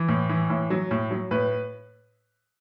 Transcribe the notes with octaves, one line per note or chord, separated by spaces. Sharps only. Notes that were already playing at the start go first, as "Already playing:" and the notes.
Already playing: E3
A2
E3
A2
F#3
A2
F#3
A2 B4